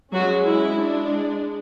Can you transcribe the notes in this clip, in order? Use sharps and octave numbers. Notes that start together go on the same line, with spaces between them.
F#3 G#3 C#4 F#4
E4
G#3 D4